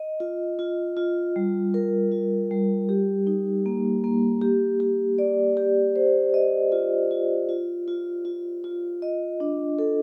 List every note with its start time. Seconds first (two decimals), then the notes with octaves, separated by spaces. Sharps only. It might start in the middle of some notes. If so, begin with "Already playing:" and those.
Already playing: D#5
0.20 F4
0.59 F4
0.97 F4
1.36 G3
1.74 A#4
2.12 F4
2.51 G3
2.89 G4
3.27 D#4
3.66 A#3
4.04 A#3
4.41 G4
4.80 G4
5.18 D5
5.57 G4
5.96 C5
6.34 D#5
6.72 F4
7.11 F4
7.49 F4
7.88 F4
8.25 F4
8.64 F4
9.02 D#5
9.40 D4
9.79 A4